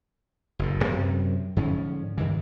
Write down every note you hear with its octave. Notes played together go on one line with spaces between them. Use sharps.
F#1 A2
F#2 C3 C4
G#2 D3 F3 C#4
G2 D#3 E3